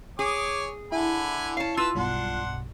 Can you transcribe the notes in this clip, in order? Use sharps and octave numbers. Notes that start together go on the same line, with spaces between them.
G#4 C#5 G#5 D6
D3 E4 G#5 B5
C#4 F5 A5
F4 B4 A5 E6
B1 G2 B2 D4 F#5 C6